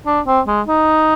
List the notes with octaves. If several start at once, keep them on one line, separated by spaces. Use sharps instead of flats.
D4
C4
G#3
D#4